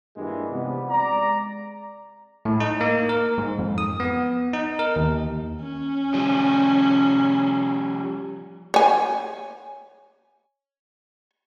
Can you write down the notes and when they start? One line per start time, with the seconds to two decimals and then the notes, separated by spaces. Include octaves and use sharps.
0.16 G2 A#2 D#3 E3 G3 G#3
0.50 C3 F3 G3 B3
0.90 G#3 D5 A#5
2.45 A2
2.60 D#4
2.81 A#3
3.09 A#4
3.38 G#2
3.59 F2
3.78 D#6
4.00 B3
4.54 D#4
4.79 A#4
4.96 D#2
5.61 C#4
6.14 F3 G3
8.74 C#5 G#5